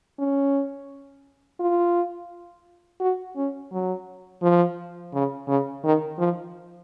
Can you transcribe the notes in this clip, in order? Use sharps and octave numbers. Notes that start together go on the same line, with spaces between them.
C#4
F4
F#4
C#4
F#3
F3
C#3
C#3
D#3
F3